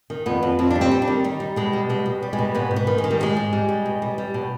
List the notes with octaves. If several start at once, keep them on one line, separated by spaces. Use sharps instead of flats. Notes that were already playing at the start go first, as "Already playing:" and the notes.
D#3
F2 B3
F2
F2 C4
G3 D4
C4
G3
D4
D#3
G3 D#4
G3
B2 G#3
G3
B2 G#3
B2
G3
G#3
B2
G#2 B3
G#2
B3
D#3
G#3
D#3
G3
G#2 G#3
G#2
G3
G3
B2
G3
G3
B2